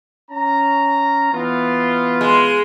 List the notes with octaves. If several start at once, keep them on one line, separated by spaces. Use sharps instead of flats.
C#4 A#5
E3 B3 F4
G#3